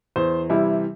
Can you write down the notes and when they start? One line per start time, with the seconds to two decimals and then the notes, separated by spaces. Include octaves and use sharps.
0.16 E2 C5
0.50 C3 E3 G3 E4